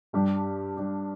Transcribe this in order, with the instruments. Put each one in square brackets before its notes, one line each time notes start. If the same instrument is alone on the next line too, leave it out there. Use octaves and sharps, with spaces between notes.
[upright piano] G2 [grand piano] G3 D4 G4
[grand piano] G3 D4 G4